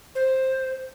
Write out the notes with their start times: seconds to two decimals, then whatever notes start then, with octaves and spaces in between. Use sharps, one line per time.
0.15 C5